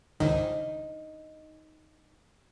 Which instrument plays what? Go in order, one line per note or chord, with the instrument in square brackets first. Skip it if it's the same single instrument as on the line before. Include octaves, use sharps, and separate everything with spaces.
[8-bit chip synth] C#2 D#3 [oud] D#4